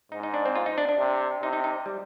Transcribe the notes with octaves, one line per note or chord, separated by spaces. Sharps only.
G#2 D#4
D#4
D4
C4
F4
D#4
D4
D4
C3
C3 D#4
D#4
D#4
G3